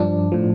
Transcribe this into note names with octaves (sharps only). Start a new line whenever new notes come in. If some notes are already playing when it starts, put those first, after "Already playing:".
Already playing: G2 F3 D4
A2 F3